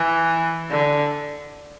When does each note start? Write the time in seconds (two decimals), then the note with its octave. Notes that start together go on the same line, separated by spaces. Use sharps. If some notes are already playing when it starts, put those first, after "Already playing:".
Already playing: E3
0.70 D3